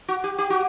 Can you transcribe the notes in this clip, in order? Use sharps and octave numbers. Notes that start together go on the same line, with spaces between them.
F#4
G4
G4
F#4